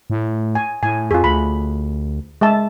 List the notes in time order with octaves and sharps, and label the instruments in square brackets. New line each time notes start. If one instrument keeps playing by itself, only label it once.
[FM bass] A2
[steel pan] G#5
[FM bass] A2 [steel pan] G#5
[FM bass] F2 [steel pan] F4 G#4
[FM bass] D2 [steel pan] B5
[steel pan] G#3 E5 A5